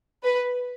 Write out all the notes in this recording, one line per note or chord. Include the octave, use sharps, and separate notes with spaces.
B4